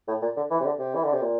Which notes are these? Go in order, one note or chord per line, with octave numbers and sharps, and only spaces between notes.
A2
A#2
D3
E3
C3
D3
C3
E3
D3
C3
A#2